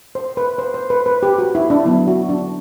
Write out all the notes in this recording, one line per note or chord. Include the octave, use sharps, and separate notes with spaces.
C5
B4
C5
C5
B4
B4
G4
F#4
E4
D4
F#3 B3 E4
F#4
D4